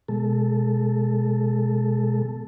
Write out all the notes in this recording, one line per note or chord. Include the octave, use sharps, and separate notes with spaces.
B2 G#3 A4